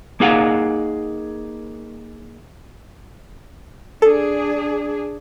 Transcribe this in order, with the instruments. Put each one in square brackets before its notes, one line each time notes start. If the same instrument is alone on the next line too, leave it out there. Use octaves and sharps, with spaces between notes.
[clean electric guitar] A#3 D#4 G#4 F5 F#5
[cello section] D4 G#4 [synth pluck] A4